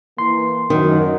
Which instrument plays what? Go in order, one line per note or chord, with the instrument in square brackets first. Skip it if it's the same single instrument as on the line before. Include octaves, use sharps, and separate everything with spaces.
[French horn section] E3 A#3 [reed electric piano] C6
[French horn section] F#2 [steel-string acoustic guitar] D#3 [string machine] F#3